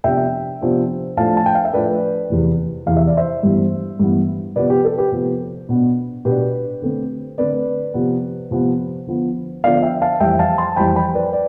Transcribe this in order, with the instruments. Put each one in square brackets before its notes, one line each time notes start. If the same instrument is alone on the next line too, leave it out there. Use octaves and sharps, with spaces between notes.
[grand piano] C3 F3 B3 D4 E5 G5
C3 F3 B3 D4
A2 F3 A3 D4 F5 A5
A5
G5
F5
E5
A2 F3 A3 D4 B4 D5
E2 C3 E3
E2 C3 E3 F5
E5
D5
C5 E5
G2 E3 B3
G2 E3 B3
C3 F3 B3 B4 D5
G4
A4
G4 B4
C3 F3 B3
B2 B3 D4
B2 B3 D4 G4 B4
D3 A3 C4
D3 A3 C4 B4 D5
C3 F3 B3
C3 F3 B3
D3 F3 B3
D3 F3 B3 D5 F5
E5 G5
F5 A5
F2 E3 G3 E5 G5
F5 A5
A5 C6
F2 E3 G3 G5 B5
G5 B5
B4 D5
D5